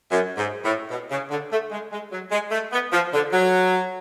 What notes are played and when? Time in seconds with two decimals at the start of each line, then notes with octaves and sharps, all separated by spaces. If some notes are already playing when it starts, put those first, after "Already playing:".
0.11 F#2
0.37 G#2
0.64 A2
0.91 B2
1.11 C#3
1.31 D3
1.51 A3
1.71 G#3
1.92 G#3
2.12 F#3
2.32 G#3
2.52 A3
2.73 B3
2.93 F3
3.13 D3
3.32 F#3